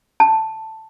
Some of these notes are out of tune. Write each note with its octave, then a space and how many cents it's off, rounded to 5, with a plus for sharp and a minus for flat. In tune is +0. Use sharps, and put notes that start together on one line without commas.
A5 +5